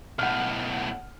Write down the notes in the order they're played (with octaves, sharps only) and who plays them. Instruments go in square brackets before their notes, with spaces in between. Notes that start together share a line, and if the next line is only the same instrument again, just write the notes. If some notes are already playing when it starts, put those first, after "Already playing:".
[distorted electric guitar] B1 A2 [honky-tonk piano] F#5 F6